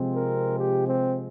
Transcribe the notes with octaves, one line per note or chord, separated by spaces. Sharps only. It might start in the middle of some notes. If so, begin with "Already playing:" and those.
Already playing: C3 F3 G#3 C4
A#4
G4
C4